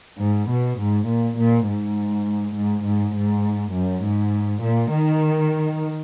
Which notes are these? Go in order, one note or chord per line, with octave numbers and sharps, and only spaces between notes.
G#2
B2
G#2
A#2
A#2
G#2
G#2
G#2
G#2
F#2
G#2
A#2
D#3